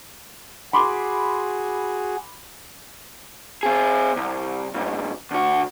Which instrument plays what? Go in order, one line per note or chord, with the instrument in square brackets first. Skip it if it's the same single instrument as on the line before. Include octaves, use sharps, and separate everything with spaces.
[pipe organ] F#4 G#4 [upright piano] B5 C6 D6
[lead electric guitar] C4 G#4
C2
F2 G#2
D2 F#4